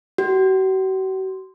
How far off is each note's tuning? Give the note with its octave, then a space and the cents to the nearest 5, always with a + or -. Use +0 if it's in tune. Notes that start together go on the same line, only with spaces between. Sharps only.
F#4 +45